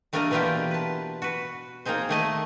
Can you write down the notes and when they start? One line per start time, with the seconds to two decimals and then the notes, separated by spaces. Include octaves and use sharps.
0.13 G3 A3 A#3 D4 A#4 D#5
0.31 B2 E3 A#3 B3 F4 G4
0.71 B4 A5
1.22 F#4 B4
1.85 A#3 C4 D#4 G#4 C5
2.09 D#3 A3 D#5 A5